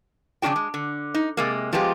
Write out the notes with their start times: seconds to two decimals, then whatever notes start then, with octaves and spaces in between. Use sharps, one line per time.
0.42 F2 C#3 A#3 D4 F#4 G5
0.56 G#3
0.74 D3
1.14 D#4
1.37 C3 G#3 A#3
1.73 F3 G#3 B3 F4 G4